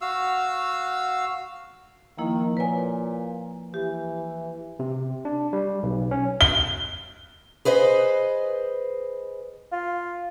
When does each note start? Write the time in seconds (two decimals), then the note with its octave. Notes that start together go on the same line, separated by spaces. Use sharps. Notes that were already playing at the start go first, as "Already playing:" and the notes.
0.01 F#4 F5 E6
2.18 D#3 F3 A#3 E4
2.57 A#2 B4 C#5 G#5
3.74 E3 G4
4.79 C3
5.25 D4
5.53 G3
5.83 B1
6.11 C#4
6.41 G7
7.65 G#4 B4 C5 D#5
9.72 F4